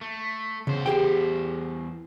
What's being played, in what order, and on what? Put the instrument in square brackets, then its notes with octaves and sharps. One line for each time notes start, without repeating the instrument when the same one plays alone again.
[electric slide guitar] A3
[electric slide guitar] E2 C5 [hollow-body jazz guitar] C#3
[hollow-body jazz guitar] G4 G#4 G5